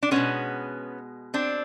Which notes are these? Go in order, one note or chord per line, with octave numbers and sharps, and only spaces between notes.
D4
B2 G#3 B3 C#4
C4 D4